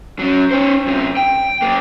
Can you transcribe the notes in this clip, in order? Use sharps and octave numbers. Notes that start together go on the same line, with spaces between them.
F#3 C#4
C#4 C5
F#2 C3
G5
F#2 A#3